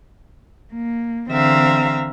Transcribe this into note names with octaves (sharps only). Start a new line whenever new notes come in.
A#3
D3 E3 C4 E5 F5 A#5